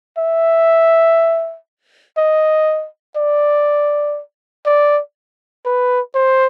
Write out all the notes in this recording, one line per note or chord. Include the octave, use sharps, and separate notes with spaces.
E5
D#5
D5
D5
B4
C5